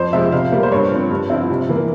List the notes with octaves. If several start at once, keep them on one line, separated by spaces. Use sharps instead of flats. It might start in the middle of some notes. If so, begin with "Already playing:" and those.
Already playing: F2 C5
C3 F3 G#3 E5
C3 F5
G3 A#3
C5
G2 C#5
F3 C4
G2
F3 C4 E4
C3
E3 A#3